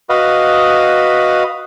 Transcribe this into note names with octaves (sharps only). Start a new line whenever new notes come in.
F#4 B4 D#5 F5